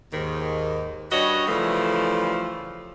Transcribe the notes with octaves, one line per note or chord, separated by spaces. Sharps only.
D#2 G#2 D#3
G3 D4 F#4 B4 C#5 D#5
C#3 E3 F3 G3 A3